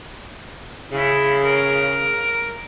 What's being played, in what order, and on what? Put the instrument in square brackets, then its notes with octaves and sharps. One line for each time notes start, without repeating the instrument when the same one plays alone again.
[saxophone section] C#3 [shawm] E4
[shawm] A#4